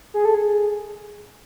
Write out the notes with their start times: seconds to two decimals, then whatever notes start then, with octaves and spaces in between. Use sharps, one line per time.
0.14 G#4
0.25 A4
0.34 G#4